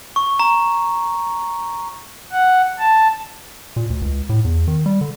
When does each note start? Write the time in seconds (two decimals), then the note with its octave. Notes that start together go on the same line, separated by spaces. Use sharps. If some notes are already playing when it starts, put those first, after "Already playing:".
0.16 C#6
0.39 A#5
2.32 F#5
2.79 A5
3.76 A#2
3.90 D2
4.02 C#2
4.29 A2
4.45 E2
4.68 D#3
4.86 G3
5.01 D3